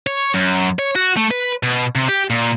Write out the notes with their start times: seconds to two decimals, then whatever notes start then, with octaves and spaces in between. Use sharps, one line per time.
0.07 C#5
0.34 F#2
0.79 C#5
0.96 F#4
1.17 A3
1.31 B4
1.63 B2
1.95 C3
2.08 G4
2.30 A#2